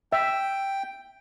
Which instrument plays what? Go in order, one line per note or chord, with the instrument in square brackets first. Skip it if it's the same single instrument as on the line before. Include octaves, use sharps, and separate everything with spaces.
[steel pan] E5 [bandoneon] G5